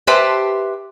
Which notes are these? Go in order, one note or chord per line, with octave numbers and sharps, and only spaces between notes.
G4 B4 C5 E5 G5 A5